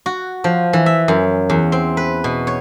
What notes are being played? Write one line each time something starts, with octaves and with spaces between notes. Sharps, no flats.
F#4
F3
E3
E5
F#2
E2
C4
B4
B2
C#5